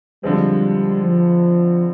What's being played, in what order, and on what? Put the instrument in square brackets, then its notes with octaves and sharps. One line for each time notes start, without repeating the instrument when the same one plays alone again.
[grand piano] F2 D3 F3 G#3 C4 [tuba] G3
[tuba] F3